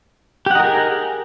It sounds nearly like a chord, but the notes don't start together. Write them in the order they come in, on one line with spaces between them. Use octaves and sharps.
G4 F#5 D#4 A#4 G#4